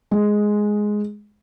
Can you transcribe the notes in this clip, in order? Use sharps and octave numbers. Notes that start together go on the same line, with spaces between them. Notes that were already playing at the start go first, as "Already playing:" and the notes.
G#3